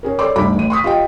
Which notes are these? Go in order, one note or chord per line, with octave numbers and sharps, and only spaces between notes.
C#4 G#4 A#4
A4 C#5 D5 C6 D6
G1 D2 D#4 B5 D6
A1 D#7
C6 C#6 D#6 B6
F4 G4 D#5 G5